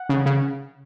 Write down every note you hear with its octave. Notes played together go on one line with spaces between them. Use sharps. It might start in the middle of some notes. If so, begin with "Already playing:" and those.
Already playing: F#5
C#3
C#3